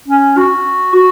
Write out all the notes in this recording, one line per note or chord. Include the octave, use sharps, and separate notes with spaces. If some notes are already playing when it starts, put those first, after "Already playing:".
C#4
F#4
F#4